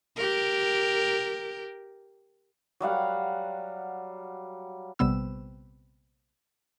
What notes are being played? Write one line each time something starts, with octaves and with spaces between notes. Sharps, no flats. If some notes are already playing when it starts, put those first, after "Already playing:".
G4 A#4
F#3 G3 F5 F#5
A#1 C3 G3 B3 E6